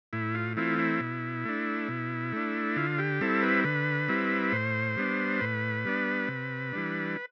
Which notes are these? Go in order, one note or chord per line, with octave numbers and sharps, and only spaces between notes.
A2 E4
F4
E3 A3 C4 E4 F4
E4
B2
A3 D4
B2
A3 D4
D3 F4
G4
G3 C4 E4 A4
B4
D3 B4
G3 C4 E4
A2 C5
G3 B3 D4
A2 B4
G3 B3 D4
C3
E3 G3 D4